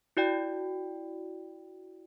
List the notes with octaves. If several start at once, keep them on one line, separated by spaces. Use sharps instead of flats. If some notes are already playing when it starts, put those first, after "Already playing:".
E4 F#4 D5 G5